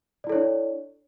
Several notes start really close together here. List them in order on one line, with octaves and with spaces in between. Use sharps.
D5 E4 A4 C#5 D4